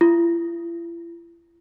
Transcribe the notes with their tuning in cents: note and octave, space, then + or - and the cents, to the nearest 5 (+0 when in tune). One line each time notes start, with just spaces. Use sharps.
E4 +45